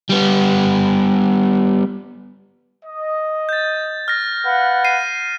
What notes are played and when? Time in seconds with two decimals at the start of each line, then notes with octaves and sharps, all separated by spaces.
0.09 G3 B3
2.85 D#5
3.49 G6 A6
4.08 F6 A#6
4.45 B4 F5 F#5
4.85 C7 D#7